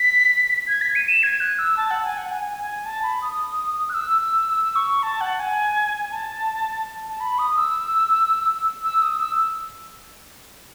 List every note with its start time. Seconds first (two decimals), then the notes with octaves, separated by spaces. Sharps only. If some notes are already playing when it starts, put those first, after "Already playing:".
Already playing: B6
0.68 G#6
0.81 B6
0.96 D#7
1.09 E7
1.23 G#6
1.40 F#6
1.59 E6
1.77 A5
1.91 F#5
2.04 G#5
2.18 F#5
2.31 G#5
2.58 G#5
2.86 A5
3.03 B5
3.22 D#6
3.90 F#6
3.94 E6
4.21 E6
4.49 E6
4.76 C#6
5.03 A5
5.21 F#5
5.40 G#5
6.12 A5
7.09 A5
7.20 B5
7.39 D#6
7.57 E6
8.84 E6
9.02 D#6
9.20 E6